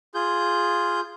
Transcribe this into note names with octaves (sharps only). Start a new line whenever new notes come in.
F4 G#4 G6